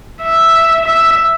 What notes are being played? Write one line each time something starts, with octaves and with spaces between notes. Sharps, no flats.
E5
E5